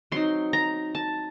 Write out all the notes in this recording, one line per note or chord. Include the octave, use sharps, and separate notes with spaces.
F#3 C4 D#4 C6
A#5
A5